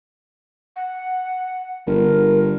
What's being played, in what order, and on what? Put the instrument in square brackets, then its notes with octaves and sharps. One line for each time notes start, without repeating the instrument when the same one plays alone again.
[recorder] F#5
[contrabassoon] G1 [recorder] A#4